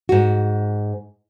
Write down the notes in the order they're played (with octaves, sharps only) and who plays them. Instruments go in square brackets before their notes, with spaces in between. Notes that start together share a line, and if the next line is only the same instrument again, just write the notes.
[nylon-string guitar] G#2 F#4